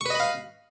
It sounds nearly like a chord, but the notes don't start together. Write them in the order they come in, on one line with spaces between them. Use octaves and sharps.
C#6 B4 D#5 B5 F5